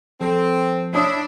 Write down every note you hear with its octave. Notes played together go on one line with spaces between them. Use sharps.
F3 C4 A4
D4 E4 C#5 D#6